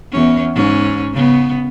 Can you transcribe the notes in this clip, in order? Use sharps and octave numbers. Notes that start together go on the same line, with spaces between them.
E2 C#4
G#2 C#4
C#3 B3